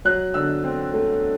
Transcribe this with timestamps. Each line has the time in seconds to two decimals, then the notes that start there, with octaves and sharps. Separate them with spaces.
0.05 F#3 F#6
0.34 D3 E6
0.64 C4
0.94 A3